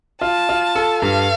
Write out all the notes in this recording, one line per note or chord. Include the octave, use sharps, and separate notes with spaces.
F4 A5
F4
A4
G2 F5